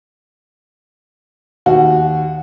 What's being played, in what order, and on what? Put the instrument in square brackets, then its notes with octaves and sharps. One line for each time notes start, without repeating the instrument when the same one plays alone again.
[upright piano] D#2 F#4